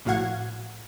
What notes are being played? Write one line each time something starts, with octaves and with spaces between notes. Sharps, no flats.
A#1 A2 F#4 F5 F#5 G#6